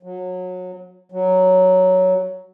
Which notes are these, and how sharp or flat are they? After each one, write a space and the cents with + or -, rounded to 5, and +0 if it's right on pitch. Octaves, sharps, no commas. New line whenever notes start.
F#3 -25
F#3 +5